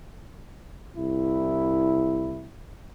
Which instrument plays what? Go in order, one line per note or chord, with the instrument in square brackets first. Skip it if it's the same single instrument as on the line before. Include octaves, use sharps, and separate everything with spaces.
[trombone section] C2 E4